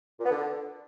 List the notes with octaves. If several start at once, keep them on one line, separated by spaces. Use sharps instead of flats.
A#2
B3
D3